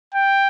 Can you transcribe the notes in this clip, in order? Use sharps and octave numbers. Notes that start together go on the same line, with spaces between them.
G5